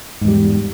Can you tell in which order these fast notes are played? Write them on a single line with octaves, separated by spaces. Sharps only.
G#2 E2 G3